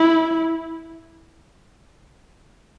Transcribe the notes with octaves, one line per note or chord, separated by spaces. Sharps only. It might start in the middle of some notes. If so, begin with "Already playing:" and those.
Already playing: E4